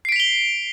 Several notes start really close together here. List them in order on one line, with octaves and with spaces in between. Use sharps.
C7 D7 B6 F7 G7